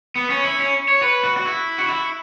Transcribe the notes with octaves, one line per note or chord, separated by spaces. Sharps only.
B3
C#4
E4
C#4
C#5
B4
F#4
F#4
E4
F#4
E4